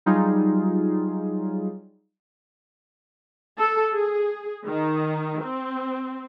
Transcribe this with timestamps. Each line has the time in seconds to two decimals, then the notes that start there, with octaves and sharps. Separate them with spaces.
0.06 F#3 G3 D#4 F4 G#4
3.57 A4
3.94 G#4
4.66 D#3
5.42 C4